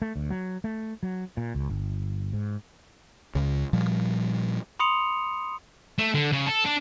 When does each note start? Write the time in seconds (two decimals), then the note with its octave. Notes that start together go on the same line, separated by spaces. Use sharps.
0.02 A3
0.16 D2
0.30 F#3
0.64 A3
1.03 F#3
1.37 A#2
1.55 C#2
1.69 G1
2.33 G#2
3.35 C#2 C#3
3.73 A#2 F3 G3
4.80 B5 C6 D#6 C#7 F7
5.98 A3
6.15 D3
6.32 C#3
6.47 A4
6.65 D4